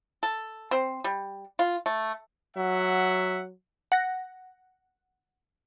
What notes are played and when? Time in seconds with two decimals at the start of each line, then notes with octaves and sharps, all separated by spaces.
0.23 A4
0.71 C4
1.04 G3
1.59 F4
1.86 A3
2.57 F#3 E5 F#5
3.92 F#5 A#6